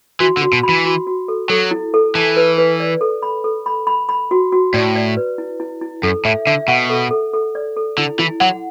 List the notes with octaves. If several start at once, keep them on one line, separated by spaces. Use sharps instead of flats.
E3 F#4
D3
F#4
B2
B5
E3
F#4
F#4
A4
F#3 A4
E4
A4
E3 A5
B4
B4
D5
A4
B5
A4
B5
B5
B5
F#4
F#4
A2 D5
D5
B4
E4
E4
E4
F#2 A4
A2 E5
D3 E5
B2 F#5
A4
A4
A4
D5
A4
D3 E4
E3 E4
F#3 F#5